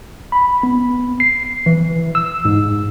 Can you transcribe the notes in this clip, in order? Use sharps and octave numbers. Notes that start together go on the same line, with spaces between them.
B5
B3
C7
E3
E6
G#2